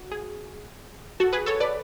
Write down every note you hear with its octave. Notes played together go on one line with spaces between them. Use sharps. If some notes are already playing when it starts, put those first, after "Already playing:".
Already playing: F#4
G#4
F#4 A4
G#4 B4
A4 C#5
B4 D5